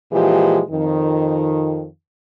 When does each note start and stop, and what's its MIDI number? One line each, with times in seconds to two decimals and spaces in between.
0.13 0.61 46
0.13 0.61 52
0.13 0.61 53
0.13 0.61 56
0.13 0.61 67
0.71 1.86 41
0.71 1.86 51